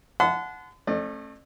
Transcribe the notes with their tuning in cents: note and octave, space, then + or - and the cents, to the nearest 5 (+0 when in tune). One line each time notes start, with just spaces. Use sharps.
F#5 -15 A5 -30 C6 -40
A3 +0 C#4 -40 D5 +45